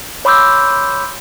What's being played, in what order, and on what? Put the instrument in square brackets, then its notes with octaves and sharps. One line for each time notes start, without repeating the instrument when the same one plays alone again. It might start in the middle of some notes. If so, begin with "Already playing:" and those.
[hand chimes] C#5 B5 C6 D6 E6 G6